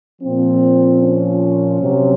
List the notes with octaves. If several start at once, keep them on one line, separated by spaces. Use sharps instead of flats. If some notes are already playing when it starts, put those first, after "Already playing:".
A#2 F3 C4
C#4
C3 F#3